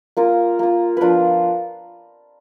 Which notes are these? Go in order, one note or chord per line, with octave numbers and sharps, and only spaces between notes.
A#3 F4 A#4
A#3 F4
F3 B3 D4 F4 A#4 B4